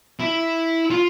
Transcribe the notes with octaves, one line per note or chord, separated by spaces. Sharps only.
E4
F4